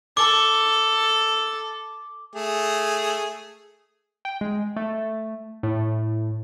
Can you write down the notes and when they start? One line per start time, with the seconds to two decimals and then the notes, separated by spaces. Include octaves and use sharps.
0.17 A4 D6
2.35 A3 G#4
4.25 G5
4.41 G#3
4.76 A3
5.63 A2